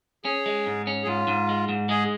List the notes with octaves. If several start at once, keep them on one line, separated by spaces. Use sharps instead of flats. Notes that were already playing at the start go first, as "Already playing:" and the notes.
C#4 G#4
G#3
G#2
C#4
G#4
G#2 F4
G#2
G#3
G#2
G#3 G#4